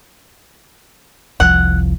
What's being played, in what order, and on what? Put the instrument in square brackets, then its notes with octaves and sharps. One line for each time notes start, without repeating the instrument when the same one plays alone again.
[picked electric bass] F1 C2 F3 [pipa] F#5